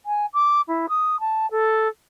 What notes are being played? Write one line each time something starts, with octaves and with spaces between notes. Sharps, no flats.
G#5
D6
E4
D#6
A5
A4